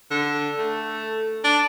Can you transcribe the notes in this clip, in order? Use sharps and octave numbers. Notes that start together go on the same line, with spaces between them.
D3
A3
D4